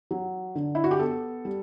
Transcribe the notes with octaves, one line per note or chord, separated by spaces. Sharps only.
F#3
D3
E4
F#4
G4
B3 A4
G3